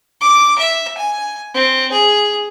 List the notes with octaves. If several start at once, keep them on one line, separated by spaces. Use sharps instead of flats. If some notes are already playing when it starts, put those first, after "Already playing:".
D6
E5
G#5
C4
G#4